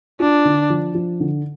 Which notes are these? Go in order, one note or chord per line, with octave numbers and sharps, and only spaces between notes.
D4 F4
D3
F3
F3
D3